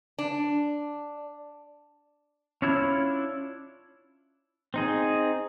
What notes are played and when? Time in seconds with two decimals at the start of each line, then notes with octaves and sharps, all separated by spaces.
0.19 D4
2.62 C#4 D4 E4 F4 C#5
4.74 C4 D#4 G#4